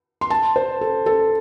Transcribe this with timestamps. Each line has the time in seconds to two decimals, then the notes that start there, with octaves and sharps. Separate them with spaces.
0.21 C6
0.30 A5
0.56 C5
0.81 A4
1.06 A4